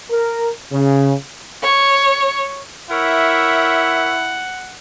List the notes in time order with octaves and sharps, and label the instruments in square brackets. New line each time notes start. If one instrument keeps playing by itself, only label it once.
[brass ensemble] A#4
C#3
[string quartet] C#5
[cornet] E4 [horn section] A#4 C#5 E5 [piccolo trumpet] F#5